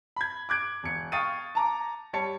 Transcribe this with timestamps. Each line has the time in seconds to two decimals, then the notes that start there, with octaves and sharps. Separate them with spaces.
0.16 B5 G#6
0.49 D6 F#6 G#6 D7
0.83 E1 C#7
1.12 F5 G5 C#6 D#6 A6 D#7
1.55 A5 A#5 D6
2.13 G3 C#5 A5 C#7